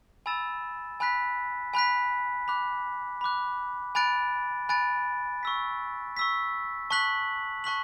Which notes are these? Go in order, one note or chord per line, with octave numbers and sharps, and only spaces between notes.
G#5 B5 E6 A6 E7
G#5 B5 F#6 B6
G#5 B5 F#6 B6
B5 D6 F#6
B5 D6 F#6
G#5 B5 F#6 A6 D7
G#5 B5 F#6 A6 D7
C#6 E6 B6
C#6 E6 B6
A5 C#6 F#6 B6 F#7
A5 C#6 F#6 B6 F#7